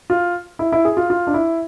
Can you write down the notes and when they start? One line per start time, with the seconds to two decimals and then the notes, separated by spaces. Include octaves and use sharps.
0.10 F4
0.59 E4
0.72 E4
0.85 G#4
0.97 F4
1.10 F4
1.27 D4
1.34 E4